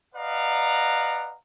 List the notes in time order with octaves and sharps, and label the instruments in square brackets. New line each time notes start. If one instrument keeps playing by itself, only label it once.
[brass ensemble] B4 D5 D#5 F5 F#5 A#5